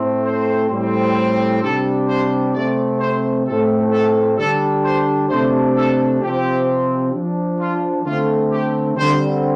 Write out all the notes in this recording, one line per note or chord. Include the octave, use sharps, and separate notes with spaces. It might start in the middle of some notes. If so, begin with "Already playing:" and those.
Already playing: A2 A3 C4
C5
A2 G3 C4
C3 G3 D4 A4
C5
C3 A3 C4 D5
C5
A2 A3 C4 A4
A4
D3 G3 D4 A4
C5
C3 A3 D4 C5
A4
C3 F3 C4 G4
F3 D4
F4
D3 A3 C4 F4
G4
D3 G3 C4 C5